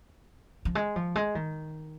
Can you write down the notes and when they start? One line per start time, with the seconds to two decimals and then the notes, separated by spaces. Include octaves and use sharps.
0.65 F3
0.75 G#3
0.96 F3
1.15 G#3
1.35 D#3